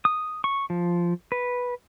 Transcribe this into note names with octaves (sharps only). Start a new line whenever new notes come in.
D#6
C#6
F3
B4